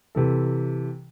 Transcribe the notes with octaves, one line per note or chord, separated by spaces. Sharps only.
C3 E3 A4